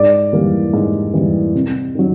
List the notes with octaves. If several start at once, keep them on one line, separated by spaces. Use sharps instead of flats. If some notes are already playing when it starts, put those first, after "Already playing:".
Already playing: G#2 D5
E3 G3 A#3
G#2
E3 G3 A#3
C3
D#3 F#3